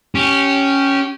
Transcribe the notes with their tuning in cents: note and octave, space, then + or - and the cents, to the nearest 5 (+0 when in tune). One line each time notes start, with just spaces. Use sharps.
C#4 +0 G4 -15